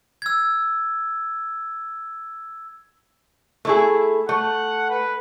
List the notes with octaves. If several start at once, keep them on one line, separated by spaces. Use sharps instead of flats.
E6 G#6
A3 E4 G#4
A3 F#5
B4